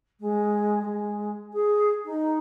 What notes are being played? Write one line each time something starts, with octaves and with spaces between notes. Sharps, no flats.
G#3
G#3
G#4
D#4